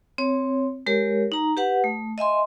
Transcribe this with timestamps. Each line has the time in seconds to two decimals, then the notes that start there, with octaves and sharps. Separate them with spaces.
0.18 C4 C#5
0.86 G#3 G4 A#4 C#5
1.32 D#4 A#5
1.57 G4 B4 F#5
1.84 A3
2.18 D#5 E5 G#5 C6